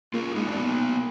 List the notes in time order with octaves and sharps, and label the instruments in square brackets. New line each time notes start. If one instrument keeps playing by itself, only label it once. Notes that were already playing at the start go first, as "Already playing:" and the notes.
[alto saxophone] A#3 [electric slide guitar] F4 G#4
[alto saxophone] G#3 [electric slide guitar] D#4 F#4
[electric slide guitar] D4
[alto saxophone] A#3 [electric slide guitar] B3 D#4